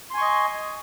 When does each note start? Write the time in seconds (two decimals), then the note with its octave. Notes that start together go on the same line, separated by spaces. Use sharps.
0.10 C6
0.14 G#5
0.18 C#6
0.21 D#5